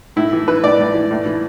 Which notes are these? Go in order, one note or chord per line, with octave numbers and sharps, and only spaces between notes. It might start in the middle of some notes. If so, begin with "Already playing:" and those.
A2 E4
E3
E3 B4
A2 D5
A2
E3
A2
E3